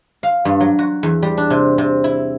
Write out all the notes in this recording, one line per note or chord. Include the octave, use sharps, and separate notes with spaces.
F5
G2
F#3
F#4
E2
G3
D4
C3
C3
E4